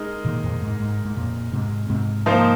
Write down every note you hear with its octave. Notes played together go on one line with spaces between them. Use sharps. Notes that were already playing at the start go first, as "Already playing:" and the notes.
Already playing: G#3 D#4 A#4
A#2 D#3
F2 A#2
G#2
G#2
G#2
F2 A#2
G#2 C3
G#2 C3
F3 A#3 D#4 C5